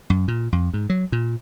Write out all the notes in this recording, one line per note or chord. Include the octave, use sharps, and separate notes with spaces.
F#2
A#2
F2
G#2
F#3
A#2